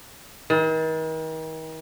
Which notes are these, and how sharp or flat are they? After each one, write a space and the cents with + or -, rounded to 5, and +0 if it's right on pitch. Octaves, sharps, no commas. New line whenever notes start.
D#3 +40